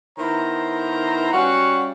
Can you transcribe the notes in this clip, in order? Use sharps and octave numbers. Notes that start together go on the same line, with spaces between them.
D#3 B3 E4 C5 A#5
G3 C#4 F#4 F5 F#5